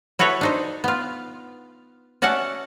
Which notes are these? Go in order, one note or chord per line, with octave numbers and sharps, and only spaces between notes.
E4 F#4 A4 B4 C#5
D4 D#4 C5
B3 F4
C#4 F#4 D5 E5 F#5 A5